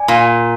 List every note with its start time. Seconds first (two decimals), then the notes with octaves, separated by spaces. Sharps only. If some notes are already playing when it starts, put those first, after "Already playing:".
Already playing: D5 G#5
0.08 A#2